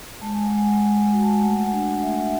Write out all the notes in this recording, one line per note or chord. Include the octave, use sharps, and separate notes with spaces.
G#3 A5
G#5
F#5
G#3
G#5
G#3
F#4
A5
G#5
A3 F#5
D4
A3 E5
F#5